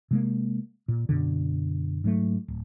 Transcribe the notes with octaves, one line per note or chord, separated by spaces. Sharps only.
C3 G#3 A#3
A#2
F#2 B2 D3
G#2 F#3 A3
D1